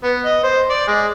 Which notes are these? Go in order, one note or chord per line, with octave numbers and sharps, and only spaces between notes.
B3
D#5
C5
D5
G#3